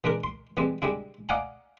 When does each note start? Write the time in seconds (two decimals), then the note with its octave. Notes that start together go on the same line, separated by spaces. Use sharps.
0.04 E3 G#3 D4 A#4
0.24 C6
0.57 E3 G3 G#3 C4
0.82 G3 G#3 D4 E4
1.29 D5 D#5 F5 F#5 G#5 A#5